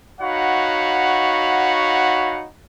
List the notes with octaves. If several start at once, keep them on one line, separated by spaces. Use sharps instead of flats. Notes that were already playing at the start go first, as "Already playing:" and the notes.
D#4 F#4 C#5 F5 F#5 B5